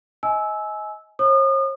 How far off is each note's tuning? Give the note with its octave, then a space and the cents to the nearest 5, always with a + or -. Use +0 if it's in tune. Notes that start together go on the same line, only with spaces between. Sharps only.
D#5 +30 G#5 +25 E6 -10
C#5 -45 D#6 -40